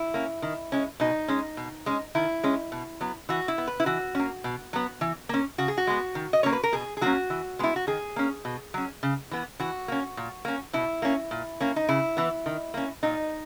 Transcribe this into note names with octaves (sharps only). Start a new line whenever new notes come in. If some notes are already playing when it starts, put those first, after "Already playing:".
Already playing: E4
A#3 C#4
D#3
G#3 C#4
B2 D#4
G#3 C#4
B2
G#3 C#4
D#3 E4
G#3 C#4
B2
F#3 B3
E3 F#4
E4
B3
B4
E4
E3 F#4
A#3 C#4
B2
F#3 B3
E3
A#3 C#4
C#3 F#4
G#4
F#4
G#3 B3
D#3
D#5
A#3 C#4 C#5
B4
A#4
B2 G#4
G#4
F#3 A#3 C#4 F#4
E3
G#3 B3 E4
F#4
D#3 G#4
A#3 C#4
B2
F#3 C#4
C#3
E3 B3
E3 F#4
A#3 C#4
A#2
A#3 C#4
B2 E4
A#3 C#4
A#2
A#3 C#4
D#4
C#3 E4
E3 B3
D#3
A#3 C#4
A#2 D#4